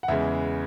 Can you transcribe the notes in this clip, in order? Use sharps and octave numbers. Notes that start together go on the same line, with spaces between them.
F#5
E2 C#3 E3 G#3 E5